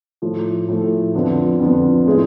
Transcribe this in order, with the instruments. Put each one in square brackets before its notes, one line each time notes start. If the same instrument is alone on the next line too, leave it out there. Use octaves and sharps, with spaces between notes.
[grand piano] A2 F3 A3
A2 F3 A3
F2 D3 F3 B3
F2 D3 F3 B3
A2 G#3 B3 E4